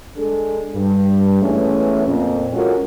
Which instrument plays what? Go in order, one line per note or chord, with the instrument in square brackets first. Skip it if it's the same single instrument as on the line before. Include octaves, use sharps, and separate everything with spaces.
[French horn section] G#3 D4 G#4 A4
G2
E3 G#3 A3 B3 C#4
F2 A#2
G#3 C#4 F4 F#4 A4 A#4